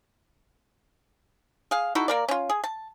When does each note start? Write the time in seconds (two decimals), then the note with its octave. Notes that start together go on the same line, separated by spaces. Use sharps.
1.71 G#4 F5
1.95 D#4 E4 F#4 A4
2.08 A#3 A#4 D5
2.28 C#4 F4
2.50 G#4
2.64 A5